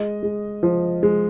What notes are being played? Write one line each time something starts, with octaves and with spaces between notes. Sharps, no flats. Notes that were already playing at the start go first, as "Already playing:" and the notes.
Already playing: G#3 D#5
G#3
F3
G#3